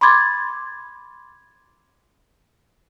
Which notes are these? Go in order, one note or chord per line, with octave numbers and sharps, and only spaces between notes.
B5 C6 D6 G#6 A6